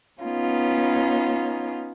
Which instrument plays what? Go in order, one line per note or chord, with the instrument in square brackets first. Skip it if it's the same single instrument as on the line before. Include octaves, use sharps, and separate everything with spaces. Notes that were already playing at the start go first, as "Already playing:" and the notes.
[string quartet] B3 C#4 D#4 F4